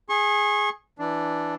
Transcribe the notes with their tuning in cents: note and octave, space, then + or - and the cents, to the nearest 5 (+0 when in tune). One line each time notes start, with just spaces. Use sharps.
G#4 +0 C#6 -35
E3 +0 D4 +0